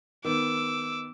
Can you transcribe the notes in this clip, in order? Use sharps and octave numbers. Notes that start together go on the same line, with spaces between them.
D#3 B3 D6 E6